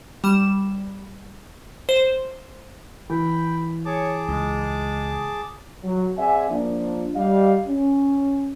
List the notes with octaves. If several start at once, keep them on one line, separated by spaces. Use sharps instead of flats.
G3 E7
C5
E3 G5 B5
G#4 C#5 A5 D6
C#2 G#3
F#3
C4 G#4 D5 E5 F#5 G#5
F3 A#3 D4
G3 D#5 F5
C#4